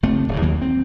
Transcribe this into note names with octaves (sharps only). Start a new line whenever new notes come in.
F#1 A3 C4
D1 G2
D#2 D#3 F#3 A#3
C4